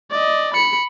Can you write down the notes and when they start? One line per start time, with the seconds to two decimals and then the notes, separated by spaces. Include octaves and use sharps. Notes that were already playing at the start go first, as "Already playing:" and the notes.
0.10 D5 D#5
0.54 B5 C#7